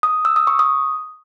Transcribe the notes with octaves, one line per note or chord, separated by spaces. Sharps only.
D#6
E6
D#6
C#6
D#6